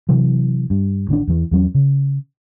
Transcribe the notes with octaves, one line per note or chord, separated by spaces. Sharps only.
C3 E3 F#3
G2
A1 D#3 C#4 D4
E2 E3
E2 F#3 C#4
C#3